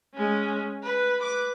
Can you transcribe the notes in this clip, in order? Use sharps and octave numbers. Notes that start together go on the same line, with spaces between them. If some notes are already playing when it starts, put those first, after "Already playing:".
G#3 C#4
B4
B4 D6